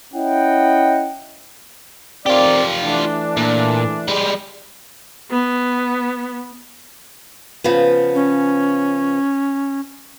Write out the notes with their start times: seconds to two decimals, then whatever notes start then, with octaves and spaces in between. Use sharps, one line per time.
0.14 C#4 E4 D#5 F#5 G5
2.26 C4 F4 G4 A#4 D5
2.84 E3 A3 D4
3.37 A#2
4.08 G3 G#3
5.31 B3
7.64 C#3 F3 B3
8.15 C#4